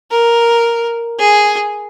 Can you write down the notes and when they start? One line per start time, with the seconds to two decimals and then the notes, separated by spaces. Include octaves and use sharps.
0.11 A#4
1.19 G#4